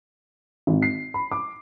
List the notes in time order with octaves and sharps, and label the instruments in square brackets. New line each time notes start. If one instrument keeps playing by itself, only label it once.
[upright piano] G#1
C7
B5
D6